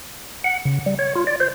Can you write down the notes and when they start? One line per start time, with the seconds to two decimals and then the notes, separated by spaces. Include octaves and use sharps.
0.44 F#5
0.65 C#3
0.86 G3
0.99 C#5
1.15 F4
1.27 D5
1.40 C5